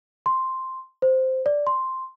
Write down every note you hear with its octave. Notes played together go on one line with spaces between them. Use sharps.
C6
C5
D5
C6